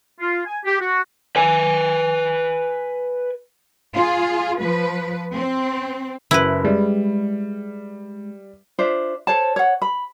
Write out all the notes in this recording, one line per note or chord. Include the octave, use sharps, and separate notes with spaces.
F4
G#5
G4
F#4
B4 G#5
F4 G#4
F3 B4
C4
F#1 E4 B4
G3 G#3
D4 F4 C5 E5
A4 C5 C#5 A5
C#5 F#5
B5